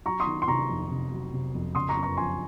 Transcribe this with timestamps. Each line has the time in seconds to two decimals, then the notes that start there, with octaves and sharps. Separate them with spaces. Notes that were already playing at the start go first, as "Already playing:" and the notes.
0.06 F#3 A#5 C#6
0.20 C6 D#6
0.27 D#3
0.42 C6
0.48 C3 A#5 C#6
0.69 F2
0.91 C3
1.12 F#3
1.33 C3
1.55 F2
1.75 C#3 C6 D#6
1.89 A#5 C#6
1.97 F#2
2.03 A#5 C#6
2.17 F3 G#5 C6